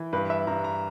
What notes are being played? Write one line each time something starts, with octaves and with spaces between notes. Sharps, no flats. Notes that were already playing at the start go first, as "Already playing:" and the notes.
Already playing: E3
G2 B4
E5
G2 A#5
A#5